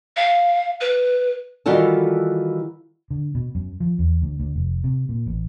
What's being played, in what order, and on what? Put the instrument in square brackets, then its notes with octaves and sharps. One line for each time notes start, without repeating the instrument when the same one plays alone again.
[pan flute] F5
B4
[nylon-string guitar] D#3 E3 G3 F4 F#4 A4
[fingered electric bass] D3
B2
F#2
F3
E2
D2
D2
F1
C3
A#2
A1